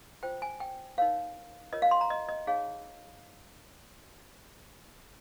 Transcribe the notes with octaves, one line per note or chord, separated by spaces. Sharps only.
F4 C5 G5
G#5
G5
D#4 A#4 C#5 F5
F4 A#4 C#5 D#5
F5
C6
A#5
D#5
D#5
D#4 G#4 C#5 F5